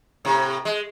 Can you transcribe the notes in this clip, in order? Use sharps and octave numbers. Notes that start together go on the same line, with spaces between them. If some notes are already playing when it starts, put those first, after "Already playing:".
A2 C3
G#3